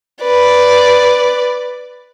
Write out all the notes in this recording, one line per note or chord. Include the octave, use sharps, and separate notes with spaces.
B4 D5